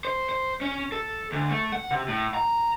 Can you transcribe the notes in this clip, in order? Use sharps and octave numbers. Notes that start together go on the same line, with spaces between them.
C5
C5
C#4
A4
D2
A3
F#5
C3
A2
A#5